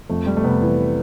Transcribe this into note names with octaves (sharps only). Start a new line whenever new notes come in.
F2 A3
G3
A3
C3 B3
E3